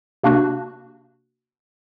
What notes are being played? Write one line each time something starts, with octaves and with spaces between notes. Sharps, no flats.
C3 A#3 D4 F#4 F#6